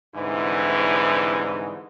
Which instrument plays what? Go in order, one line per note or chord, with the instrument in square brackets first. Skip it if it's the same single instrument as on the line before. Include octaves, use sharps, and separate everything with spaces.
[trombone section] C2 G#2 D3 E3